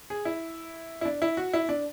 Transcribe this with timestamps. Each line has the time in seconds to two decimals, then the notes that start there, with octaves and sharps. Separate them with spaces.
0.10 G#4
0.25 E4
1.01 E4
1.05 D4
1.22 E4
1.37 F#4
1.53 E4
1.69 D4